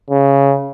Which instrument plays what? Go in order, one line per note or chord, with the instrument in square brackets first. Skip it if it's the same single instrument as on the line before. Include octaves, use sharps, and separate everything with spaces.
[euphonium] C#3